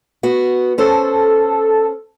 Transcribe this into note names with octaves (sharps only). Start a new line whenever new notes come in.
B3 F#4
C#4 A4 C5